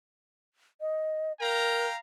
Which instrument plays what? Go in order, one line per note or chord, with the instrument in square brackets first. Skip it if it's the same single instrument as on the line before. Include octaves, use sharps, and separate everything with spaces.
[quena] D#5
[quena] A#4 [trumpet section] F5 G5 A#5